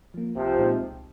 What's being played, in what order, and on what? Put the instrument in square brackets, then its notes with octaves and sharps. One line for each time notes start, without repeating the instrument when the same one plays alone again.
[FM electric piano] F3 A#3
[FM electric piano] C2 [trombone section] C3 F3
[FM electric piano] A#2 G#3 C4 D#4
C2